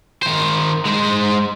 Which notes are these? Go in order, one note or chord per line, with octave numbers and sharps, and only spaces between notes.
D#3 C5
G#3 C5